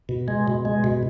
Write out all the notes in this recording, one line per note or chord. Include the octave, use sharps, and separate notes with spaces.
B2
G#3
B2
G#3
B2